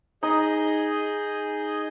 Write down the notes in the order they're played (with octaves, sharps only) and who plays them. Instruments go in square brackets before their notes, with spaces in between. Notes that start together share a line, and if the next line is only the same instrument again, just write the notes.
[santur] D#4 [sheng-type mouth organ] G#4 D#5 G6